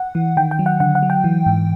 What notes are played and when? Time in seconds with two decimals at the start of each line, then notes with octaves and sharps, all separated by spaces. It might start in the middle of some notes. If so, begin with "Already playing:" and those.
Already playing: F#5
0.15 E3
0.37 D#3 G5
0.51 G5
0.59 F#3
0.66 F#5
0.80 D3 F#5
0.95 F#5
1.03 F#3
1.10 G5
1.24 E3
1.46 G#2